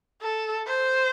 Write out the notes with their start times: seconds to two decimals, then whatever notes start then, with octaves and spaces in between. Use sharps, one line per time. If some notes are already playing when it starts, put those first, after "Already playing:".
0.21 A4
0.67 C5